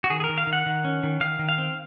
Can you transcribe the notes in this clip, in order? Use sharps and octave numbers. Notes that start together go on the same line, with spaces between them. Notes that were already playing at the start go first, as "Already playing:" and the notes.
F#4
D#3 G#4
G#4
A#4
D#3
F5
D#3
F#5
D#3
C#4
D#3
D#3 F5
D#3
F5
C4